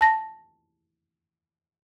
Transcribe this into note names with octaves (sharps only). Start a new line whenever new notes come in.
A5 A#6